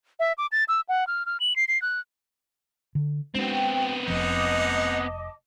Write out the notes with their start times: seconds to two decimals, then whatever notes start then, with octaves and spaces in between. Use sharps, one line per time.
0.20 E5
0.38 D6
0.52 A6
0.68 E6
0.89 F#5
1.07 F6
1.26 F6
1.40 F#7
1.56 C7
1.68 C7
1.82 F#6
2.95 D3
3.35 G#3 B3 C4 D4 F#4 G5
4.08 F1 F3 D#4 G#4 D#5 F#5 A5 D6